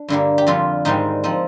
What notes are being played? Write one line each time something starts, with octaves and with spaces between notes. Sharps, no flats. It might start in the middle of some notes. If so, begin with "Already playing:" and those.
Already playing: D4
G2 D3 G3 A#3
G4
F2 D3 G3 F4
G#2 D#3 G3 C4 D#4
F3 C4 D#4